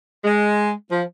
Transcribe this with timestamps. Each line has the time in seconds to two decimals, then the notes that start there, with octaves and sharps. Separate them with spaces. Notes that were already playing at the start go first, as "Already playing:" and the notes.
0.24 G#3
0.90 F3